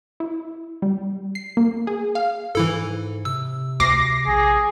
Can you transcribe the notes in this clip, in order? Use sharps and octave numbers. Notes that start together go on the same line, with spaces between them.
E4
G3
C7
A#3
G#4
F5
G#2 E3 E4 A4
C3 E6
D2 D6 A#6 C7
A#1 G#4